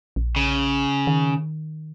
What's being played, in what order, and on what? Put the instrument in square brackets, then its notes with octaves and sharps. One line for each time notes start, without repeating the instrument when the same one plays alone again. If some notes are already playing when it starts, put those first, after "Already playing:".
[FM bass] A#1
[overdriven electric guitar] C#3
[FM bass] D#3